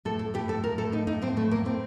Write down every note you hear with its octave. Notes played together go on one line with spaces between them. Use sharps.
A2 A4
A2 A4
A2 G4
A2 A4
A2 A#4
A2 A4
A2 D#4
A2 D#4
A2 C4
A2 A3
A2 A#3
A2 C4